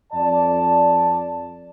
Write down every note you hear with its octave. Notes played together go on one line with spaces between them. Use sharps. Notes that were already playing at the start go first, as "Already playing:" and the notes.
F2 D5 A5